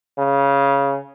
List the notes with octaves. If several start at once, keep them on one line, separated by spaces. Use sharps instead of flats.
C#3